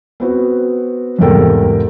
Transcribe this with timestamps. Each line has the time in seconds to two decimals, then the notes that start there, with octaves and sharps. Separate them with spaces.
0.20 B3 C4 F#4
1.19 E2 G#2 C3 A4 A#4 G5